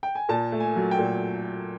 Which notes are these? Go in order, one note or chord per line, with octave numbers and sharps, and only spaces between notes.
G5
G#5
A#2 A5
A3
G#5
F#3
G5
A#2